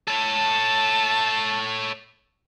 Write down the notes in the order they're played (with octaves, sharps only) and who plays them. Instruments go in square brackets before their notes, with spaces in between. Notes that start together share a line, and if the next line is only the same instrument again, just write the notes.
[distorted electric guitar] A4 C#5 [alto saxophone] A5